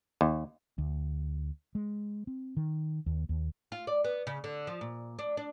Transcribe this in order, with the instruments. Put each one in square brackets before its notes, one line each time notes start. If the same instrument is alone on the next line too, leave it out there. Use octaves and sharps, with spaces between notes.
[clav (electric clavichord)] D#2
[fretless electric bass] D2
G#3
C4
D#3
D#2
D#2
[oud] F4
D5
B3
C#3
D3
F3
A#2
D4
D4